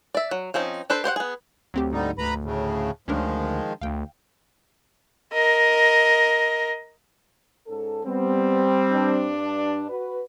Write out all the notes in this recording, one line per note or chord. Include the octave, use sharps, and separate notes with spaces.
D5 E5
F#3
F3 C4 C#4 D#4
D4 A4 B4 C5
G4 C5 C#5 F#5
B3 G#4
D2 F#3 C4 G4
G#2 D3 G3 D#4
D2 B4 A#5 B5
A2 C#3
D2 D#3 F3 G#3 C#4 D4 A#4
D2 F5 G5
A#4 D#5
G#2 C#4 A4
G3 B3 C4
G2 D4
F#4 B4